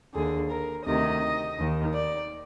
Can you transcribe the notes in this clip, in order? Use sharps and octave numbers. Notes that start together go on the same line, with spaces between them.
D#2 D3 G#4
A#4
D2 C3 D#3 D#5
D#2 D#3
D5